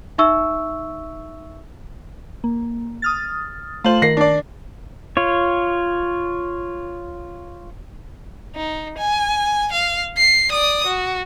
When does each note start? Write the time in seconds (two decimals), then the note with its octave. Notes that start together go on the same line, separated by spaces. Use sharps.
0.18 D#4 E5 C#6 E6
2.44 A#3
3.02 D#6 F6 A6
3.84 A3 F4 C5 F#7
4.02 D#3 A#4 A#6 C7
4.17 D4 D5
5.17 F4 C#5
8.56 D#4
8.98 G#5
9.72 F5
10.17 C7
10.51 D5 D#6
10.86 F#4